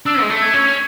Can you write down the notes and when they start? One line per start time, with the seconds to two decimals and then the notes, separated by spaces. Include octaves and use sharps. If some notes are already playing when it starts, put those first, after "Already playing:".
0.05 D4 E6
0.21 G#3
0.30 A3
0.41 G#6
0.53 C#4